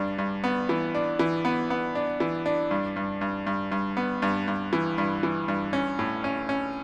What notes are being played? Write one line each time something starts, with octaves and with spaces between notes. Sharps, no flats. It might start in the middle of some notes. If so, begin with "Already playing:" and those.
Already playing: G2 D4
G2
B3
E3
D4
E3
B3
B3
D4
E3
D4
G2
G2
G2
G2
G2
B3
G2
G2
E3
G2
E3
G2
C#4
A2
C#4
C#4